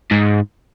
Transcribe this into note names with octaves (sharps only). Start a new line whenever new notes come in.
G#2